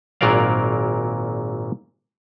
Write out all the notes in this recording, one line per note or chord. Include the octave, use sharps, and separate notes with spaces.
G#1 A#2 F#3 A#4 D5 F5